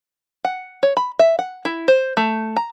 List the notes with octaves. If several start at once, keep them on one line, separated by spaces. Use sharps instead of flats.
F#5
C#5
B5
E5
F#5
E4
C5
A3
A#5